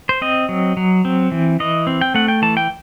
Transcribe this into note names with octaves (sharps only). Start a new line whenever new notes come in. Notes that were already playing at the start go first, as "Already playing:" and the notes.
C5
C4 D#5
F#3
F#3
C4
E3
E3 D#5
C4
G5
A3 F#5
G5
E3 A5
G5